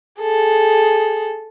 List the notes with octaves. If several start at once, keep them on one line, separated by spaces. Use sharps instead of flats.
G#4 A4